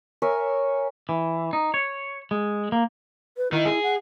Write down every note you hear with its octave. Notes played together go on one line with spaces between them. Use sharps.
A#4 C#5 E5 G#5
E3
D#4
C#5
G#3
A#3
B4
D#3 D#4 E4
G#4
F#5